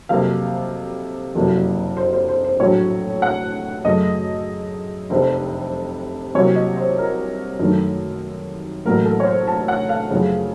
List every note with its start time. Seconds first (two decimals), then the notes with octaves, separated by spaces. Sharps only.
0.09 F2 C3 F#3 A#3 F5
1.35 F#1 F2 C3 F#3 A#3
1.97 C5
2.13 C5
2.29 C5
2.44 C5
2.60 A#1 A2 F#3 A3 C#5
3.22 F#5
3.85 F#2 C#3 A3 D#5
5.10 F1 F2 C3 C5
6.35 C2 C3 F#3 A#3 C#5
6.56 D#5
6.76 C5
6.98 A#4
7.59 F#2 D#3 A3
8.85 A1 A2 F#3 A#3 A#4
9.05 A4
9.20 C#5
9.27 C5
9.47 A5
9.68 F#5
9.89 F5
10.10 F#2 C#3 F3 A3